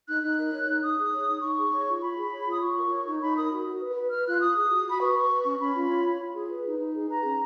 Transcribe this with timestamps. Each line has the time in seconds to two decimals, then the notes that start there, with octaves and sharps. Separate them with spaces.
0.09 D#4 F#6
0.23 D#4 F#6
0.38 A#4
0.52 C#5
0.68 D#4
0.83 D#4 D#6
0.97 G#4
1.13 C#5
1.28 D#4
1.42 D#4 C#6
1.58 G#4
1.72 C#5
1.88 F4
2.02 F4 B5
2.16 G#4
2.32 C#5
2.47 F4
2.52 D#6
2.62 F4 C#6
2.77 A#4
2.92 C#5
3.06 D#4
3.21 D#4 B5
3.36 A#4 D#6
3.51 F#4
3.66 F#4
3.80 B4
3.95 B4
4.11 B4 F6
4.26 F4 F#6
4.41 F4 D#6
4.56 G#4
4.71 F#4
4.86 F#4 B5
5.00 B4 C#6
5.15 B4
5.30 B4
5.45 C#4
5.60 C#4 B5
5.75 F4
5.90 C#5
6.05 F4
6.19 F4
6.34 G#4
6.49 B4
6.65 D#4
6.79 D#4
6.94 G#4
7.09 B4 A#5
7.24 C#4